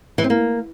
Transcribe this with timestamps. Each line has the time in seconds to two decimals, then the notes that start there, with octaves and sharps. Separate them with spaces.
0.18 E3
0.24 C4
0.30 A#3